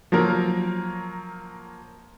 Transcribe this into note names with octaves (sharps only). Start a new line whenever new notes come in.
F3 F#3 A#3 A#4